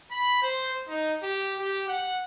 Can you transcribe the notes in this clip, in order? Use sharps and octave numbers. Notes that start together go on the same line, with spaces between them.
B5
C5
D#4
G4
G4
F#5